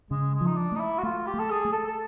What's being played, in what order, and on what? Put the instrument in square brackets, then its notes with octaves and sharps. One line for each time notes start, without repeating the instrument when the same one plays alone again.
[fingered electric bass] C#3 [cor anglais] G#3
[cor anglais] G#3
[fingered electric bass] F3
[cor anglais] D#4
D4
[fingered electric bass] A3 [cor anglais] D#4
[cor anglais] E4
F#4
[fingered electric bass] A3 [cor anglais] F4
[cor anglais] G4
[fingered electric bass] A3
[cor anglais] A4
G#4
[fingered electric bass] A3
[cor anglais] A4
A4